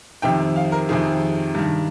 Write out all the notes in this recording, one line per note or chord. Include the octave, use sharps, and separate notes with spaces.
F2 C3 D#3 G5
F5
A#4
F2 C3 D#3 G#4
G2 D#3